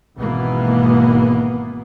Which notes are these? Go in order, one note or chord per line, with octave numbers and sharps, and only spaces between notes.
G#1 B2 E3 A#3 B3